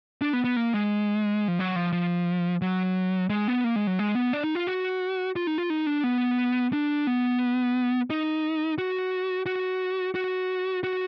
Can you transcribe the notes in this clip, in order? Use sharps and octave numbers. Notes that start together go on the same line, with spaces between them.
D4
B3
B3
A#3
G#3
F3
F#3
F3
F3
F#3
G#3
B3
A#3
G#3
F#3
G#3
B3
D4
D#4
F4
F#4
F4
D#4
F4
D#4
D4
B3
D4
B3
D#4
F#4
F#4
F#4
F#4